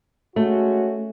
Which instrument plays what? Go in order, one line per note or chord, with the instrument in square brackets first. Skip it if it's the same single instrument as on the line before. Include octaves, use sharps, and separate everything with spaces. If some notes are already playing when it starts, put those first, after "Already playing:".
[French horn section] G#3 C#4 F#4 [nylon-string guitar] A3